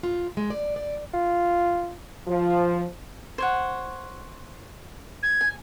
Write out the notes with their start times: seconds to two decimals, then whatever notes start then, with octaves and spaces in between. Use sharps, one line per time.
0.03 F4
0.37 G#3
0.50 D5
0.76 D5
1.14 F4
2.28 F3
3.38 C5 C#5 F#5
5.23 G#6
5.41 G#5